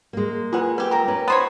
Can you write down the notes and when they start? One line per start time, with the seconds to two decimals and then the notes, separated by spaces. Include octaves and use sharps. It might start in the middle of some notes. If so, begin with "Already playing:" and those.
0.13 G#3 A#3
0.53 F4 G#4 B4 F#5
0.78 G4 B4 G#5
0.91 G4 A#4 A#5
1.08 C#4 B4
1.28 B3 D#4 C5 C#5 B5 D#6